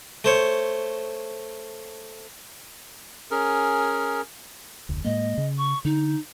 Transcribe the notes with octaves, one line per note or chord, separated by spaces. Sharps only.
A3 C5 C#5
C#4 G#4 A#4
F1 D2
A2 G#3 A#3 D#5
C#3
C#6
D3 D#4